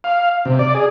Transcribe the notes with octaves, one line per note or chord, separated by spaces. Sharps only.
F5
C3
D5
G#4